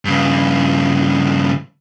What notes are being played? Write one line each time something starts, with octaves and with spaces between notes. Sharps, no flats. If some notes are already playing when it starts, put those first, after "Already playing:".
G2 C#3